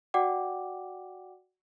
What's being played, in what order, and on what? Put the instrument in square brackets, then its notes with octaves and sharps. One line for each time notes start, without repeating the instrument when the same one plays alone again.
[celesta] F#4 D5 F#5 G5 D6